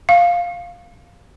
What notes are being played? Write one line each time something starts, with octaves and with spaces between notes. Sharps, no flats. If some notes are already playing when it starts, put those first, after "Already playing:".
F5